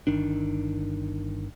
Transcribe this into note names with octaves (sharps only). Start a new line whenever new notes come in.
G1 D#3 D4